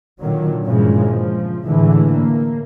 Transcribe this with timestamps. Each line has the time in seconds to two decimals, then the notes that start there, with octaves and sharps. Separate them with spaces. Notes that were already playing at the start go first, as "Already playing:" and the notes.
0.21 A#2 D3 D#3 F#3
0.65 G2 A#2 C#3 E3 F3 G#3
1.09 F3
1.67 A2 D3 E3 G#3
2.12 A#3